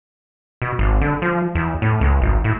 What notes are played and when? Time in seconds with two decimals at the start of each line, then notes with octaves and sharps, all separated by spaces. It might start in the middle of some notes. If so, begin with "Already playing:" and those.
0.62 B2
0.79 G#1
1.01 D3
1.22 F3
1.55 E2
1.82 A2
2.01 C#2
2.22 G#1
2.44 A2